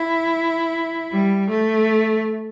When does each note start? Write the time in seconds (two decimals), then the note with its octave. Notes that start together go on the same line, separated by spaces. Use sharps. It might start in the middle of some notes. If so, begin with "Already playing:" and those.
Already playing: E4
1.12 G3
1.50 A3